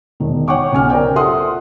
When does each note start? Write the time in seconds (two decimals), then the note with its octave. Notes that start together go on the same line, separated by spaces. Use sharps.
0.20 E1 D#3
0.48 C#5 F#5 G5 C#6 D6
0.72 B1 C#3 G#5 F6
0.90 A#4 C5 D5 G5
1.15 F4 A4 E5 F#5 C6 D#6